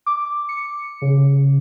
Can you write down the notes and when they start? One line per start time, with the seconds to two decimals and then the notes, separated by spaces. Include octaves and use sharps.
0.06 D6
0.49 C#7
1.02 C#3